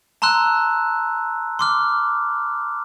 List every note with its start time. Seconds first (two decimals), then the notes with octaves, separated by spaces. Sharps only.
0.22 A5 A#5 C6 E6 F#6
1.59 C6 D6 F6